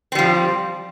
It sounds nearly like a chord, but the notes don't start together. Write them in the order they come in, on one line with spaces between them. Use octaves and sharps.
C4 G3 F3